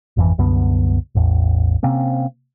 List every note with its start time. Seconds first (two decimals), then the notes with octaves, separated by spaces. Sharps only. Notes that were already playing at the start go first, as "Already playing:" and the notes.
0.17 G#1 F2 E3
0.38 C2 F#2 D3 B3
1.15 A1 E2
1.83 C3 A#3 C4 C#4